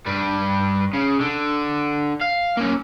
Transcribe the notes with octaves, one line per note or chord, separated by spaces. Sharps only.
G2 G3
C#3
D3
F5
A#3 C#4